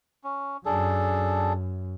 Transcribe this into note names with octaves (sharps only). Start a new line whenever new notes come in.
C#4
F#2 D4 G#4 A4